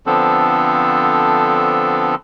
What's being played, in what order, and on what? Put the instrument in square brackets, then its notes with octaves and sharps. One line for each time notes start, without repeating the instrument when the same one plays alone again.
[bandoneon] D3 F3 B3 C4 D4 A4